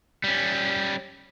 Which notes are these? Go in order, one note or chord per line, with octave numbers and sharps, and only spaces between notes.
G3 C#4